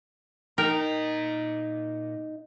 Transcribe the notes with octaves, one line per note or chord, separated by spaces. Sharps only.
A#2 D#4 A#4 G5 A#5